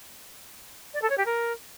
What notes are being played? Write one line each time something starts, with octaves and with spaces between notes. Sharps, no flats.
D5
A4
C#5
G4
A#4